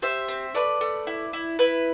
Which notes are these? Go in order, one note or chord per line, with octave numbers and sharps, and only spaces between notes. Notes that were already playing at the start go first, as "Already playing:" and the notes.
G4 C5 E5
C4
A3 B4 D5
A3
E4
E4
E4 B4